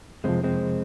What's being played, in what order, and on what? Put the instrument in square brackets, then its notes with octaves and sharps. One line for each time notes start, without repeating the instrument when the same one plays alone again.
[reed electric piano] F2 C3 F3 [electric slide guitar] G#3 C4
[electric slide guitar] G#3 C4